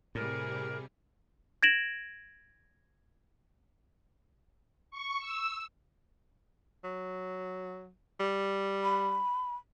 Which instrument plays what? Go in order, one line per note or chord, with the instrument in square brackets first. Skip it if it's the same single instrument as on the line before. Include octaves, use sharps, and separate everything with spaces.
[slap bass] A2 [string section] C3 G3 G#4 [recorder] A#4
[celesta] G#6 A#6 D7 E7 F#7
[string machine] C#6
E6
[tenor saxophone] F#3
G3
[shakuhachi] B5